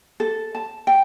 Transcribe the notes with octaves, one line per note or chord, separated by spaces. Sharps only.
A4
A5
G5